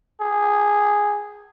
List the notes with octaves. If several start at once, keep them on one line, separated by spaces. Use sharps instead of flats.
G#4